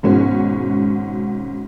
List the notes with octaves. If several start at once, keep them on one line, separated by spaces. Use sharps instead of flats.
G#1 G#2 B2 C#4 F#4